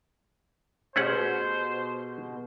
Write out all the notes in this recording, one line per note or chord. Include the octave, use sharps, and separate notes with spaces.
B2 A3 C#4 G4 G#4 C5 F#5 F6